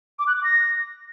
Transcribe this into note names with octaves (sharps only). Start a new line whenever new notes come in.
D6
F#6
D6
A#6